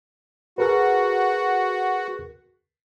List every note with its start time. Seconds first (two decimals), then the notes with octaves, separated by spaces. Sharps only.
0.58 F#4 G#4 A#4 B4